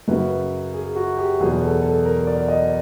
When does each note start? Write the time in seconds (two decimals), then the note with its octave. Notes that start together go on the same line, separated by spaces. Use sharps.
0.08 F#2 C#3 F#3 B4
0.73 G#4
0.96 F#4
1.18 G4
1.40 E2 B2 F#3 G#4
1.61 A4
1.83 A4
2.05 A#4
2.27 D5
2.48 D#5